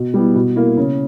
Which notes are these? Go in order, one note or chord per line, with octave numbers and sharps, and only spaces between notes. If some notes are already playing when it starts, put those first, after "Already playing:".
Already playing: B2
G3 B3 E4
B2
A#3 E4
C#3